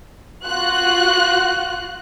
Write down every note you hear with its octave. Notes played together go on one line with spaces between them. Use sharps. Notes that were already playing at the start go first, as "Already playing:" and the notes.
F4 F#4 F#6